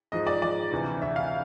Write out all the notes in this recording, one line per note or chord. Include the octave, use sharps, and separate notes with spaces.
G#2 F3 D#5
D5
G#2 F3 D5
D2 C3 E3
D2 C3 E3 E5
F5